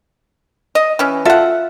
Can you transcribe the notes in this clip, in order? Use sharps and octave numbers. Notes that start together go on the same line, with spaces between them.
D#5
E3 C#4
F4 A4 E5 F#5